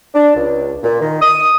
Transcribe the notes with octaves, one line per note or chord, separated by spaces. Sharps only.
D4
C#2
A#2
D#3
D#6